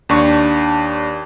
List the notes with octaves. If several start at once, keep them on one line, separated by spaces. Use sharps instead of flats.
D#2 D4 C#6